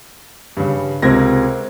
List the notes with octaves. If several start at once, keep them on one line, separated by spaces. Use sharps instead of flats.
G2 C#3
C#2 C3 C4 A#4 G#6 A#6